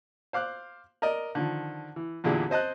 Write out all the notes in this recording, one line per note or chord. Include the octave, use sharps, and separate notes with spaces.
C5 F5 D6 F#6
A#4 D5 D#5
D3 D#3 F3
E3
E2 A#2 D3 E4 G4 G#4
C4 C5 D#5 A5 F#6